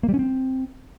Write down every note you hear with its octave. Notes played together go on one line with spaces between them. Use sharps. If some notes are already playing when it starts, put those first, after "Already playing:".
A#3
G3
C#4
C4